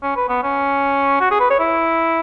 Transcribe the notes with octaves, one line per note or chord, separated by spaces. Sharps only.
C#4
B4
B3
C#4
F#4
G#4
B4
C#5
E4